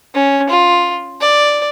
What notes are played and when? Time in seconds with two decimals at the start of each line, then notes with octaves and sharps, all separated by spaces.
0.14 C#4
0.49 F4
1.21 D5